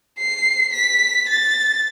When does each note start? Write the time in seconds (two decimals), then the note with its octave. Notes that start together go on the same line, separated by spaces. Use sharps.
0.19 C7
0.73 B6
1.29 A6